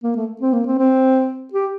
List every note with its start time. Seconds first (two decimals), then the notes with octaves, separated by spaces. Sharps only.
0.04 A#3
0.16 A3
0.41 C4
0.53 A#3
0.66 C4
0.78 C4
1.53 G4